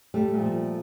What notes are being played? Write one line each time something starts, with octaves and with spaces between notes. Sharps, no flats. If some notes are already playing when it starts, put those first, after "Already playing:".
G3 A3
A#2
F3